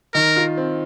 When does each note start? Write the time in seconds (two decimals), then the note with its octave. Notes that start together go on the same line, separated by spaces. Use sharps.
0.14 D#3 A#4
0.36 F4
0.57 C4